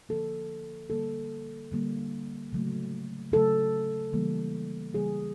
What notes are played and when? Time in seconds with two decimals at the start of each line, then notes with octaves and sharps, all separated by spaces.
0.09 D3 F3 A#3 A4
0.90 D3 G3 A#3 A4
1.71 D3 G3 A#3
2.53 C#3 F#3 A3
3.32 C#3 F#3 A3 A4
4.13 C#3 E3 G3 A#3
4.94 C#3 E3 G3 A#3 G#4